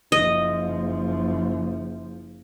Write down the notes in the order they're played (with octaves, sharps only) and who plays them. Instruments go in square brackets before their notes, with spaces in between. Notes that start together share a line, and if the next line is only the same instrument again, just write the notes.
[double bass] F#1 F3 [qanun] D#5